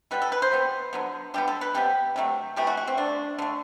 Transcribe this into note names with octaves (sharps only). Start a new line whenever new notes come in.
B2 G3 B3 B4
A4
B4
C5
B2 G3 B3
D3 F#3 B3
D3 G3 B3 G4
A4
B4
C3 G3 B3 G4
C3 F#3 A3
C3 E3 A3 G4
F#4
F#4
C4
D3 A3 D4
D3 A3